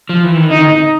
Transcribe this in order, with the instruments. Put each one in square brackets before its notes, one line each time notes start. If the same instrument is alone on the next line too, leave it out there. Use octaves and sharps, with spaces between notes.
[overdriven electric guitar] F3
E3
D#3
[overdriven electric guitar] D3 [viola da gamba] D#4